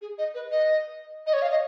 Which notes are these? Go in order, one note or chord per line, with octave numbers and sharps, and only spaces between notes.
G#4
D#5
B4
D#5
D#5
C#5
F5
D#5